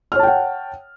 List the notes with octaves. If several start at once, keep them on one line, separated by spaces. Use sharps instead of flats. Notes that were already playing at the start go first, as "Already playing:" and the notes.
C#5 F#5 G5 A5 F6